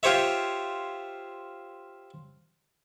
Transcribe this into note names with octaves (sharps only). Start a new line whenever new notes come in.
F4 G4 C5 C#5 E5